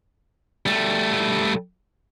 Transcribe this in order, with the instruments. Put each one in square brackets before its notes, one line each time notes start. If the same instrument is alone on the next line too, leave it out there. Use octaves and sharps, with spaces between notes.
[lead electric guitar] G3 A3